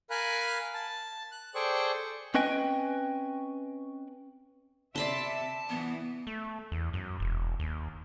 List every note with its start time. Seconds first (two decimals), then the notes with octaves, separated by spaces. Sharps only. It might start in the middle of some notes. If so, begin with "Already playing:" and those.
0.10 A#4 F5 G#5 B5 F#6
0.74 A5
1.32 F#6
1.55 G#4 A4 C5 D5 G5 C#6
2.34 C4 C#4 B4 D#5 G5 G#5
4.96 C3 D5 E5 A5 B5 C6
5.70 E3 B3
6.27 A3
6.72 E2
6.93 F#2
7.20 E1
7.60 D#2